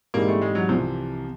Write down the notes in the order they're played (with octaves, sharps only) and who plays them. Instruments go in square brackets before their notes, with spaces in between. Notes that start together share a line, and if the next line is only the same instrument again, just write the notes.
[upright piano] G#2 E3 G3 C4 [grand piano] A#3
[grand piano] A3
G#3
F#3
[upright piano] C2 C3 E3 [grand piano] F3